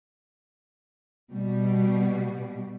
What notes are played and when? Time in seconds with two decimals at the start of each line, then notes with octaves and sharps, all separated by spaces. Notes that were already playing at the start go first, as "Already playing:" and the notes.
1.31 B2 G3